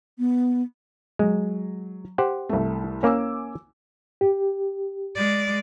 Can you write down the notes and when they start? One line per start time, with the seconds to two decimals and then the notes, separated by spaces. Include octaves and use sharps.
0.19 B3
1.19 F#3 G#3
2.18 G4 C5 F#5
2.49 C2 A3
3.03 A#3 C#4 G#5 D6 E6
4.21 G4
5.16 G#3 D5